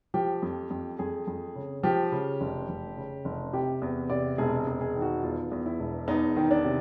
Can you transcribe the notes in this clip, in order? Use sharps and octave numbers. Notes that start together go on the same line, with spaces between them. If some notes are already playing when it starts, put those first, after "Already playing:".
F3 G4
F2
F2
F2 G#4
F2
C#3
F3 G4
C#3
F1
F1
C#3
F1
C3 G4
E2
C3 D5
E1 G#4
G#4
E1
G#4
D#3
F#4
E2 F4
E2
E4
E1
E2 D#4
D#3
D4
C3